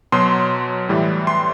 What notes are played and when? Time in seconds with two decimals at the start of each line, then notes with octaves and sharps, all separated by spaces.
0.12 B2 F#3 C6
0.89 A2 E3 G3
1.27 C6